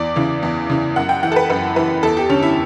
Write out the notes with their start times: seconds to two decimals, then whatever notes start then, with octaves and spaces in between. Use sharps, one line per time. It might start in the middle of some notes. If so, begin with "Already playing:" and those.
Already playing: E2 D5
0.16 C#3 E3
0.43 E2
0.70 C#3 E3
0.96 F#2 F#5
1.09 G5
1.23 E3 F#5
1.32 A4
1.36 B4
1.50 F#2 B4
1.76 E3 B4
2.03 E2 A4
2.17 G4
2.29 D3 C#4
2.42 E4